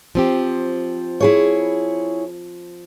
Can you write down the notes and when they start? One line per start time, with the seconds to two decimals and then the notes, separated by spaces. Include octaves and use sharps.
0.15 F3 C4 G4
1.20 E4 G#4 C#5